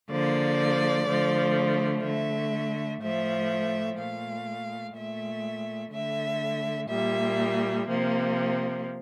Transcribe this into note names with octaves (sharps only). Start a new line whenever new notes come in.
D3 F3 A#3 D5
D3 F3 A3
D3 A3 E5
A2 F3 A3 E5
A#2 A3 F5
A#2 A3 E5
D3 A3 E5
A#2 G3 A#3 E5
C3 F3 A#3